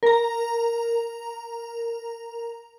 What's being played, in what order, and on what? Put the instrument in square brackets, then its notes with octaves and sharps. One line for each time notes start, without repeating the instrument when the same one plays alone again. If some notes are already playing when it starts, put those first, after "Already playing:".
[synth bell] A#4 A#5